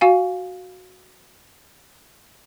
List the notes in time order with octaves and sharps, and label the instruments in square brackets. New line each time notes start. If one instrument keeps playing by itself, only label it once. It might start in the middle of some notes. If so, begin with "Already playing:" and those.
[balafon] F#4 F5 G#5